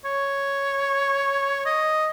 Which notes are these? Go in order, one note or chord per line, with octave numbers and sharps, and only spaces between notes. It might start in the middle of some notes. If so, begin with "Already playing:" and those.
C#5
D#5